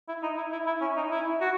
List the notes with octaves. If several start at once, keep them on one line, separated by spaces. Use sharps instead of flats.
E4
D#4
E4
E4
E4
C#4
D#4
E4
F#4